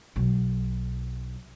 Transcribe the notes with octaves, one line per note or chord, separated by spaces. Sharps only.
B1